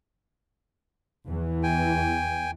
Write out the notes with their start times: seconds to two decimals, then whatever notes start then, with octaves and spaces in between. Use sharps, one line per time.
1.25 E2 E3
1.63 G5 G#5